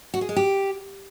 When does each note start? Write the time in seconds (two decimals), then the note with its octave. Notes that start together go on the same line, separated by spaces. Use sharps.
0.14 F#4
0.21 G#4
0.29 G#3
0.36 G4